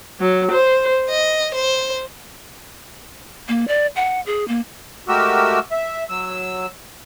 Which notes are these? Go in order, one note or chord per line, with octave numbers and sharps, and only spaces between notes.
F#3
C5
D#5
C5
A#3
D5
F#5
G#4
A#3
G#3 A3 F#4 G4 A#4 E6
E5
F#3 E6